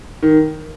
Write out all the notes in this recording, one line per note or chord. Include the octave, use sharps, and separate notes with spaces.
D#3